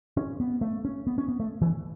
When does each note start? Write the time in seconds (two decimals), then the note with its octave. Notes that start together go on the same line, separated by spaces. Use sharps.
0.17 C#4
0.40 B3
0.61 A3
0.85 C#4
1.07 B3
1.18 C#4
1.29 B3
1.40 A3
1.62 E3